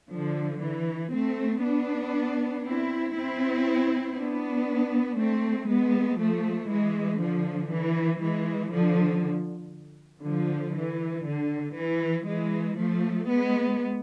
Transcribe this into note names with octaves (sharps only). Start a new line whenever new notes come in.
D3 F3
E3
A3 C4
B3 D4
C4 E4
C4 E4
B3 D4
A3 C4
G#3 B3
F3 A3
E3 G#3
D3 F3
E3
E3 G#3
D3 F3
D3 F3
E3
D3
E3
E3 G#3
F3 A3
G#3 B3